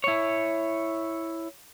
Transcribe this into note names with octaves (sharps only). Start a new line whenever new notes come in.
E4 C#5